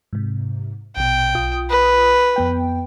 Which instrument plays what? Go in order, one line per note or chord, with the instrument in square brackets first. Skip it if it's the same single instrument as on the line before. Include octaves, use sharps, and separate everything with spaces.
[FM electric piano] G#2 C3
[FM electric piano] A#1 B2 [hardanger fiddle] G5
[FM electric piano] B1 F4 D#6
[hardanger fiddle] B4
[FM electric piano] F2 B3 G5